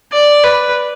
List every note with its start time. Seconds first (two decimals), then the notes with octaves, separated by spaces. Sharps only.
0.13 D5
0.44 B4